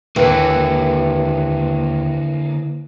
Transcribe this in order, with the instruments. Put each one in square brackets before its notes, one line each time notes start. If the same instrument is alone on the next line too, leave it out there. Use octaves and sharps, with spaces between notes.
[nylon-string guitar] D#2 [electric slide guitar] D3 A#3 [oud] E3